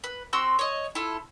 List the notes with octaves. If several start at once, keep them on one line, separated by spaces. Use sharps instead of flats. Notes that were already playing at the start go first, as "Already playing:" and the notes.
B4
C4 F#4 C6 E6
C#5 D#5
E4 F4 A4